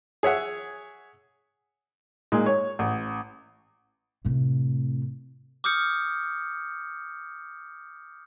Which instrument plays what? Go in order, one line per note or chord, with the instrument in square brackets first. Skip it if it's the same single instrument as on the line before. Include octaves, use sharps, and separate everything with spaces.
[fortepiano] G#4 C#5 E5 F#5
[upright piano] A#2 G#3 D#4
C#5
A1
[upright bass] A2 C3
[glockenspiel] D6 D#6 F6 G6 C#7